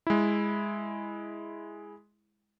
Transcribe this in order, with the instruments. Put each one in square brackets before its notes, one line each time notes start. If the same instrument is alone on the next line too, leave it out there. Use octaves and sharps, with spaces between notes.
[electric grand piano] G#3 E4